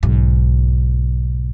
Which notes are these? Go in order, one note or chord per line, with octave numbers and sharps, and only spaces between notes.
B1 G#2